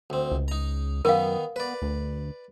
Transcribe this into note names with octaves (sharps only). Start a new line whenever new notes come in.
D2 C4
C#2
D#4 A#5
F#2 D#3 B3 D#4 A#4 F5
B3 B4 D5
D2